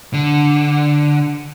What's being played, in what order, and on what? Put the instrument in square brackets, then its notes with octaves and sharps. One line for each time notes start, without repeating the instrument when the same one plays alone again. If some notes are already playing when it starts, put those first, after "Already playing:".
[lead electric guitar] D3